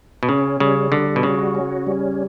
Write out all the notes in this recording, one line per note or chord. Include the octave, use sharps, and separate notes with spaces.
B2
C#3 C#4
C#3 G3
D3 G3
B2
C#3 F#4
C#4
G3